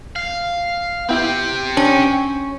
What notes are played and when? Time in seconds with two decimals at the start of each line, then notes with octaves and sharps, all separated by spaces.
0.16 F5
1.09 B3 C4 E4 G4
1.77 C#4 D4